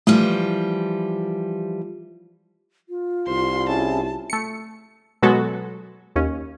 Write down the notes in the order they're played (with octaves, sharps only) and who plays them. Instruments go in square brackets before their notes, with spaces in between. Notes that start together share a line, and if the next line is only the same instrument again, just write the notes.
[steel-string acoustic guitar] E3 F3 G3 [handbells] A3
[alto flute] F4
[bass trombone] C2 [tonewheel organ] C5 [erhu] C6
[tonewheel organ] C#4 E4 G#4 [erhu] A5
[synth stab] A3 C#7
B2 F#3 G#3 B3 F#4 A4
D#2 C#4